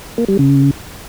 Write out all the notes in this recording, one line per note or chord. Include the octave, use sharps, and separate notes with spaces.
A#3
G3
C#3